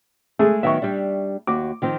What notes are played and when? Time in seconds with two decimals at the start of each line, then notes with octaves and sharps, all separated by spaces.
0.39 G#3 A3 G#4
0.63 D#3 F#3 B3 E5 C#6
0.82 G3 D4
1.47 D#2 F#4 D6
1.82 D#3 F3 C4